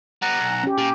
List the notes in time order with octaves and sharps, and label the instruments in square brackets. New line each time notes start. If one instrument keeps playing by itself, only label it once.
[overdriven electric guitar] G3 B3 [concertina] F#5 A#5
[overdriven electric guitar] B1
[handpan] C#4 G4
[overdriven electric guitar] A#2 [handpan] G4